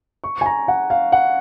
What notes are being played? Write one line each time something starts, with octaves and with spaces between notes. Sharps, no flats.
C#6
G#5
A#5
F#5
F5
F#5